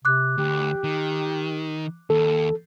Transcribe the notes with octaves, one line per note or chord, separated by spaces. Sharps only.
C3 D6 F#6
D2 G4
D#3
D#2 A4